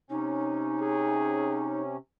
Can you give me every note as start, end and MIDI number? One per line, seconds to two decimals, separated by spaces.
0.10 1.97 48
0.10 1.97 61
0.10 1.82 63
0.81 1.66 68